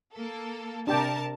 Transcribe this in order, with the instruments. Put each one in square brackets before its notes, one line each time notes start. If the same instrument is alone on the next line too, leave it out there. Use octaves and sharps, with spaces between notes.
[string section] A#3 A4
[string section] C3 A#4 A5 [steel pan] D4 G4 G5